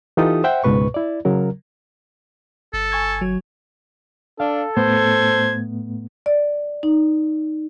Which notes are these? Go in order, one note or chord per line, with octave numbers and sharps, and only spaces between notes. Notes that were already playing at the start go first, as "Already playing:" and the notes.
E3 D#4 F4 G4 A4 D#6
C5 E5 F#5 G5
C#2 G#2 B2 B4 C#6
E4 D5
C#3 F#3 A#4
G1 A4
G#5 C#6 G#6
F#3
D4 A4 F5
A2 A3 B3 C5 G#6
D5
D#4